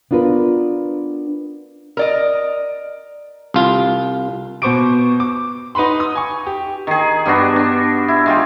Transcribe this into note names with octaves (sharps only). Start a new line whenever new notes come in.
B3 D4 F4 A#4 B4
A#4 D5 D#5
C2 F4
B2 B3 C5 C#6 D6 D7
D6
D#4 B4 F#5 B5 C6
D#6
G#5 C#6
G4
D#3 G#4
G2 B3 D4 F#4
D4
E4
G#3 F4 G4